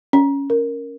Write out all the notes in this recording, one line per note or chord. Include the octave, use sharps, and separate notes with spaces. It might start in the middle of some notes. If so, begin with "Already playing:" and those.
C#4
A#4